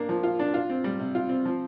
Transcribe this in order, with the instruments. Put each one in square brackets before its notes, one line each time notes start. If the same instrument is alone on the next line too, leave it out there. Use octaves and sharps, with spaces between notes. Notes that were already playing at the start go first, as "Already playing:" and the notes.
Already playing: [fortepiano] A#3 D4
F3
F4
D4
F4
C4
G3
C3
F4
C4
F3